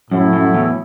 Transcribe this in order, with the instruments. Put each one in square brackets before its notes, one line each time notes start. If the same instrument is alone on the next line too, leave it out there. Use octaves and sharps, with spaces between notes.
[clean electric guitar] F#2 [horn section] A2 F#3 A3 E4
[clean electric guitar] F#2
E2